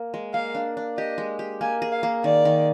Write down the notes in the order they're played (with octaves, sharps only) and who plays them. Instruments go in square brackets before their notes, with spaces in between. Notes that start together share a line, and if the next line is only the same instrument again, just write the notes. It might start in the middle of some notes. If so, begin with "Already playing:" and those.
Already playing: [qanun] A#3
G#3
[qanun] A#3 [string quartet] F5
[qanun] D4
D4
[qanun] G4 [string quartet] D#5
[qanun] G#3
G4
[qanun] A#3 [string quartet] G#5
[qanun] G#4
[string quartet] F5
[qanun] A#3
[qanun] D#3 [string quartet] D5
[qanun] D#3